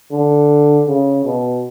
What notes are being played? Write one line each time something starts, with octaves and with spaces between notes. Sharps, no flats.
D3
C#3
B2